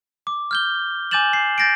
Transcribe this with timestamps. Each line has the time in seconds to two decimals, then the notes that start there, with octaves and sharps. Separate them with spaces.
0.27 D6
0.51 F6 G6 G7
1.11 G#5 D6 G6 A6 E7 F#7
1.33 C7
1.58 G6 A6 A#6 C7 D7